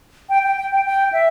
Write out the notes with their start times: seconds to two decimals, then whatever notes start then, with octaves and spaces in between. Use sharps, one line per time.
0.29 G5
0.43 G5
0.57 G5
0.72 G5
0.85 G5
1.13 E5